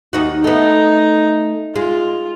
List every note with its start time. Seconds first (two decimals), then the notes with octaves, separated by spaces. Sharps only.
0.13 D#2 D#4 F#4
0.44 A3 B3 D#4
1.76 G#3 F4